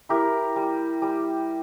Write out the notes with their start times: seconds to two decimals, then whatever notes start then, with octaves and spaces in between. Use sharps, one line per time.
0.09 E4 G4 A#4
0.56 G3
1.02 G3